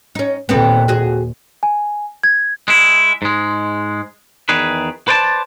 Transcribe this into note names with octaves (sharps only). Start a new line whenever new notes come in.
C#4 D#4
D#2 A#2 B3 C4 A4
F#4 G#4
G#5
G#6
G#3 E4
G#2 G#3
E2 D#3 G#4 B4
B4 C5 D5 G5 A5